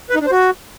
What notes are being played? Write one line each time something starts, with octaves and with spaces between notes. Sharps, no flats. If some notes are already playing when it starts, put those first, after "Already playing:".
B4
D#4
D4
C5
F#4